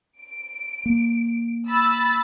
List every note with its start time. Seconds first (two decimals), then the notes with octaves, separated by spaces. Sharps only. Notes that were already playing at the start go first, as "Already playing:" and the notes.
0.20 D7
0.86 A#3
1.68 B5 E6 A6